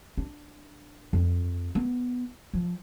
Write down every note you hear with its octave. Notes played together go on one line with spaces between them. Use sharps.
D4
F2
B3
F3